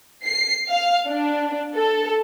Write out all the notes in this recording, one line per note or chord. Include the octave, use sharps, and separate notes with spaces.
C7
F5
D4
A4